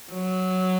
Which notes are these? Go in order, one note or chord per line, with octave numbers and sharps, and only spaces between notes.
F#3